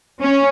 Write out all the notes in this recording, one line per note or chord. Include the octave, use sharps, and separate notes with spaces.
C#4